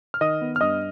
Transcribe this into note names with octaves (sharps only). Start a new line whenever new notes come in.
F6
D#3 D#5 D#6
B3
F6
G2 D#5 D#6